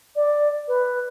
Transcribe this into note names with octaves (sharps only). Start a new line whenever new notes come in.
D5
B4